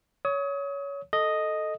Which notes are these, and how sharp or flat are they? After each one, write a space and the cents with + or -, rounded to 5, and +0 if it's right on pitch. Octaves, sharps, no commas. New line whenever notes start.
C#5 +20 D#6 +35
A4 +0 D#5 +0